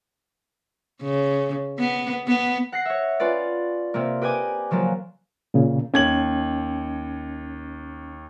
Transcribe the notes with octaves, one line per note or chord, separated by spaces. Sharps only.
C#3
B3
B3
F#5 A#6 C7
C#5 E5
C#4 F4 B4 D5
C3 A#3
G4 B4 D#5 G#5 D6
C#3 F3 F#3 A#3
A#2 C#3
D#2 C#4 G#6 F#7